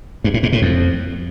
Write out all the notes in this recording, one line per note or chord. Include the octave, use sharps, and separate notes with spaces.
G2
A2
G#2
A2
F2